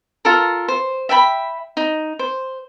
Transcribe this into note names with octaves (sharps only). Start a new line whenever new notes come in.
F4 A4 A#4
C5
E5 G5 A5 B5
D#4
C5